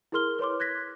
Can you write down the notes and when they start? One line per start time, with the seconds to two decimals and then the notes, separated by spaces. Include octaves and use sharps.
0.12 E4 G#4 A#4 C6 F6 G7
0.39 B4 C#5 C6 D6
0.60 F#6 G#6 A#6 B6